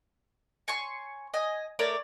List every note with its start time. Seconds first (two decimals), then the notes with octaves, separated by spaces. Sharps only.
0.68 C#5 G#5 C6 C#6
1.34 D#5 G#5
1.79 A3 A#4 C#5 D5